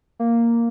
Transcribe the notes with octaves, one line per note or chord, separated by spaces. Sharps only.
A#3